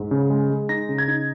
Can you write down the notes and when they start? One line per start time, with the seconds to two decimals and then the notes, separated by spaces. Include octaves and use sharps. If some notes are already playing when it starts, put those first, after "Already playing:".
Already playing: G#2
0.11 C#3
0.30 G#3
0.50 G#3
0.69 D#4 A#6
0.89 C#3
0.98 G#6
1.08 D#4